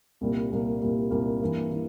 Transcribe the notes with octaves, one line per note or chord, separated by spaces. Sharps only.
C2 A#2 G3 A#3
C2 A#2 G3 A#3
C2 A#2 G3 A#3
C2 A#2 G3 A#3
G2 E3 A#3 E4
E3